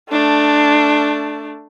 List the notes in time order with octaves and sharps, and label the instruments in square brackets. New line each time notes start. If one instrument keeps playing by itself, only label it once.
[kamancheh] A3 D4